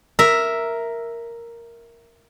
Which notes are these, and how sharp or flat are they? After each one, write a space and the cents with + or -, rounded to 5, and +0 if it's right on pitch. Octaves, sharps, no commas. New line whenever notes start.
A#4 +0 E5 +0